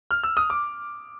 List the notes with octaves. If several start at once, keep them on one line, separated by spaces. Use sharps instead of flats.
F6
E6
D#6
D6